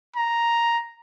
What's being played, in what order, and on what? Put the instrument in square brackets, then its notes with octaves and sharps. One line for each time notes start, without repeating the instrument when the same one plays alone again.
[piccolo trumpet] A#5